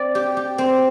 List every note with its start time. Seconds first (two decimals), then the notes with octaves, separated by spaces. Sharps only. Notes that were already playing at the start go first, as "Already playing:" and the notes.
Already playing: C4 D5
0.15 G4
0.37 G4
0.58 C4